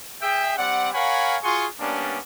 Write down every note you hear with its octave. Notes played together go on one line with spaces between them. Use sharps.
G#4 E5 G5
G3 C4 D5 F#5
A#4 C#5 F5 F#5 G#5 B5
F4 F#4 G#4 G#5 C6 C#6
G3 A#3 B3 C#4 D4